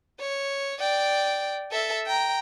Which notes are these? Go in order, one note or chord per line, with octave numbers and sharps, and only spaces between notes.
C#5
D5 G5
A4 E5
G5 A#5